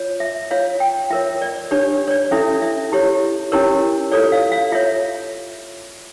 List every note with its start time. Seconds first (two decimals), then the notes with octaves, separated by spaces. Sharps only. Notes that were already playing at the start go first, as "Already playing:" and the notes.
Already playing: F4 C#5
0.20 E5
0.51 F4 C#5 F5
0.80 G5
1.10 F4 A#4 C#5 E5
1.41 D5
1.71 D4 G4 C#5 D5
2.07 C#5
2.11 D5
2.31 C#4 E4 A4 E5
2.62 E5
2.92 E4 G4 C#5
3.52 C#4 E4 G4 A#4 C#5
4.12 F4 A4 C#5 D5
4.32 F5
4.52 F5
4.72 F4 C#5 E5